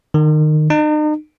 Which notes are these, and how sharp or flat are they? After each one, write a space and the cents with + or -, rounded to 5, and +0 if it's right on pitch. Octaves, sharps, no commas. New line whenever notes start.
D#3 -25
D#4 -40